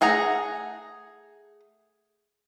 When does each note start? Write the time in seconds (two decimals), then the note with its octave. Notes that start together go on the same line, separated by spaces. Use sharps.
0.01 A3 G#4 F#5 A#5